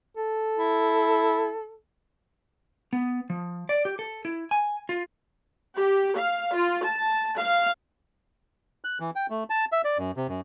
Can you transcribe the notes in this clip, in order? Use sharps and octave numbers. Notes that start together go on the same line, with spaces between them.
A4
E4
B3
F3
D5
G4
A4
E4
G#5
F4
G4
F5
F4
A5
F5
F#6
E3
G5
A3
A5
E5
D5
F#2
C3
F#2